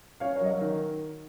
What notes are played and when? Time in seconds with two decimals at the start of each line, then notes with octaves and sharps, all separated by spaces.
0.20 C#4 C#5 F5
0.36 A#4 C#5
0.41 F#3 D#5
0.51 A#4 C#5
0.61 D#3